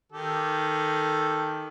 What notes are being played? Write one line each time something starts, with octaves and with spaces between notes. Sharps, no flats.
D#3 G4 A4